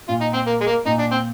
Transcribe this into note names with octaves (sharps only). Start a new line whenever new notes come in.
A#2 F4
D#4
C4
A#3
G#3
A#3
A#2 D#4
D4
C4